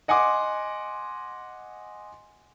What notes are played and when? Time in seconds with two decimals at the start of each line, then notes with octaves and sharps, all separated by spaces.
0.08 D#5 F#5 G#5 C6 D6